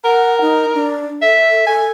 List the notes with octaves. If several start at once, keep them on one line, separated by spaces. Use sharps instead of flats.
A#4 F#5
D#4
D4
A4 E5
A4 G#5